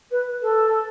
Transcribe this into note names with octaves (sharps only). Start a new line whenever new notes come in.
B4
A4